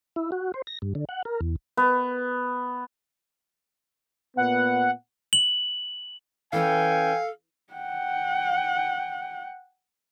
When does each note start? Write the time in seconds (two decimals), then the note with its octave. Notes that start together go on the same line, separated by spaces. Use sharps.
0.16 E4
0.32 F#4
0.54 C5
0.67 A#6
0.82 G2
0.95 D3
1.09 F#5
1.25 A#4
1.41 E2
1.77 B3
4.37 A#2 B3 F#5
5.33 F#7
6.53 E3 C#4 A4 F5 G5 G#5
7.73 F#5 G5